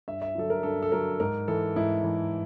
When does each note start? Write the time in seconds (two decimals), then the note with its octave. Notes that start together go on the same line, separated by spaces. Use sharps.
0.08 G2 E5
0.22 E5
0.35 D3 F#3 A4
0.50 A#4
0.63 G2 A4
0.82 A4
0.92 D3 F#3 A#4
1.20 G#2 A#4
1.48 E3 A4
1.76 G#2 E4
2.04 E3